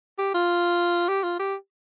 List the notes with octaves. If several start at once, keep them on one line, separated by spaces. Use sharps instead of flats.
G4
F4
G4
F4
G4